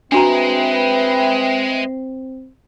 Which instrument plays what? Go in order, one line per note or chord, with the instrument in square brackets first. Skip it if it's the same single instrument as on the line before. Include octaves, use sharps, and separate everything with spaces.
[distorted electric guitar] G#3 [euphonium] C4 [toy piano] D4 F#4 A#5 [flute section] B4 E5 G5